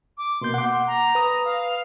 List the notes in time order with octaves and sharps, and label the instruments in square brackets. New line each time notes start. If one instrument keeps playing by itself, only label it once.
[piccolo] D6
[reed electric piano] B2 A#3 G6 [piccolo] C6
[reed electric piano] F#5 D6
[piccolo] A#5
[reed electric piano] B4 D#6
[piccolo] F5